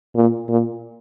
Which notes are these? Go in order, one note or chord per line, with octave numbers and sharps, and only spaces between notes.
A#2
A#2